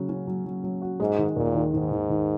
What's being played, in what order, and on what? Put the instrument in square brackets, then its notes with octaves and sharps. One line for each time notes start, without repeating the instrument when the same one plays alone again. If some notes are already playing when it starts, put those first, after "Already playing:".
Already playing: [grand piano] C#3 F#3 F#4
C#4
F#3
F#3
F#3
F#4
[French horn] G#2 [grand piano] G#3
[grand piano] D#3
[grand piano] D#2 [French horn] A#2
[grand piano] D#3
[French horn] G#2 [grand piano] D#3
[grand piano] D#3
D#3